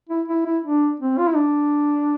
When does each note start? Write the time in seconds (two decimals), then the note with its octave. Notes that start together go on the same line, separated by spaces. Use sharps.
0.09 E4
0.28 E4
0.46 E4
0.64 D4
1.00 C4
1.18 F4
1.28 E4
1.36 D4